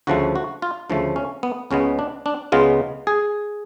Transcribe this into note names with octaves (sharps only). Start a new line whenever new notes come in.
D2 C#3 F3 A3 F#4
F#4
F4
D2 C#3 F3 A3
C#4
B3
C#2 C#3 G#3 B3 C#4
D4
D4
C#2 C#3 G#3 B3 F4
G#4